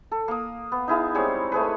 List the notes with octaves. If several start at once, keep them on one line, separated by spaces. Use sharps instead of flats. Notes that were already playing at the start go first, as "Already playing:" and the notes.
A4
A#3 D#6
B3
D#4 E4 G#4 F5
G3 G#3 C4 C#5
A3 G#4 B4